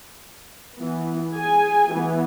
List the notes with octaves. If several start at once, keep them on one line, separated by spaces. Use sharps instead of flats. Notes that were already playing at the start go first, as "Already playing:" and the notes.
E3 B3
G#4 G#5
E3 B3